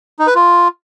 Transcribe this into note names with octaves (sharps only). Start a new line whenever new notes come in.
D#4
B4
F4